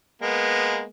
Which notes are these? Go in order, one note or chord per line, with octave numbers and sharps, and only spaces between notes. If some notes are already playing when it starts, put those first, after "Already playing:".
G#3 A#3 B3